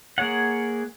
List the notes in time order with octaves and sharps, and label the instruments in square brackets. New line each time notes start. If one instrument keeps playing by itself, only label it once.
[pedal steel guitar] A#3 G#4 C#5 F#5